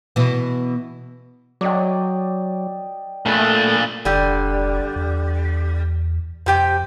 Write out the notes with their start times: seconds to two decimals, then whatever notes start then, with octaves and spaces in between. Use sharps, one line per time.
0.16 B2 E3
1.61 F#3 D5 D#5 G5
3.26 A#2 A3 D4 B5
4.05 F1 D3 G3
4.96 E2
6.46 F2 C3 G4 G5